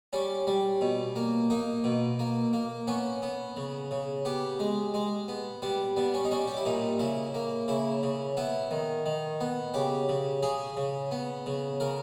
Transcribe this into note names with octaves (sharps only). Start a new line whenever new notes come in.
G3 C#4
G3
B2
A#3
A#3 D#4
B2
A#3
A#3
B3 C#4
B3
C#3
C#3
B3 G4
G#3
G#3
B3
G3 B3
G3 B3
C#4
D#4
G3 C#4
G4
E4
A#2 D#4
C#3 E4
A#3
C#3 E4
C#3
B3 E4
D#3
D#3
B3
C#3 G4
C#3
C#3 G#4
C#3
B3
C#3
C#3 A#4